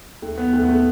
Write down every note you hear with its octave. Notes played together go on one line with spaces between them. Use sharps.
D#2 A3
B3
D#2 A3
B3
A3